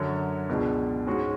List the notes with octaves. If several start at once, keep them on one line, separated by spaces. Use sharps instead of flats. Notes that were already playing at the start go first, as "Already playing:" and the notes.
Already playing: F#2 D3 F#3
C#2 B2 G#3 D4
G#2 G#3 C#4 F#4